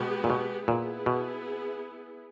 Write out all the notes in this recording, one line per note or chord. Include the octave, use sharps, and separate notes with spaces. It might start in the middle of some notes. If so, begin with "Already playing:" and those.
Already playing: B2 G#3 B3 G4
A#2
B2
A#2 B3 E4 G#4
B2